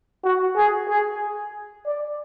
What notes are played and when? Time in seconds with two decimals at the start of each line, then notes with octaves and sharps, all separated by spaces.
0.24 F#4
0.57 G#4
0.89 G#4
1.86 D5